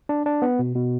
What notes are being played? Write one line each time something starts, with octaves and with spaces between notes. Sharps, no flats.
D4
D4
B3
B2
B2